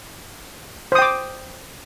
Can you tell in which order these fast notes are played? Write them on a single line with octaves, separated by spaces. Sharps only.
C5 D#6 G5 D6